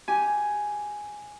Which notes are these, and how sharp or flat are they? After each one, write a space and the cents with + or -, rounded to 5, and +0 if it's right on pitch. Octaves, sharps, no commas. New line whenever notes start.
G4 +0 G#5 +5